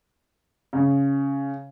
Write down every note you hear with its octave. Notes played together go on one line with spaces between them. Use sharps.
C#3